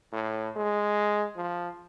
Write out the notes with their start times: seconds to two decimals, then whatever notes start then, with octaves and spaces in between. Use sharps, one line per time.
0.13 A2
0.56 G#3
1.36 F3